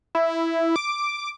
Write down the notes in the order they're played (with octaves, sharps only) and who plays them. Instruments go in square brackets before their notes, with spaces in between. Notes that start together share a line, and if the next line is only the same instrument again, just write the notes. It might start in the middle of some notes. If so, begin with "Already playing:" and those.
[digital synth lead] E4
D6